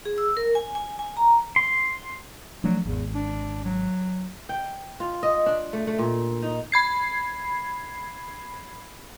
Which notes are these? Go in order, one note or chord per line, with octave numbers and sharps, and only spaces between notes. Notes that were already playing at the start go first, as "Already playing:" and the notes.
G#4
E6
A#4
G#5
G#5
G#5
A#5
C6
F3 F#3 A3 D4
G#1 E2
D4
F#3
G5
F4
D#5
D4
A3
A3
A#2
D#4
B5 G#6 C7